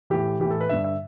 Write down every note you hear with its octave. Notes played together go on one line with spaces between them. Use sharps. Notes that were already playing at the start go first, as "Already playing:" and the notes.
A2 E3 G4
A2 E3 G4
A4
B4
G2 D3 E5
E5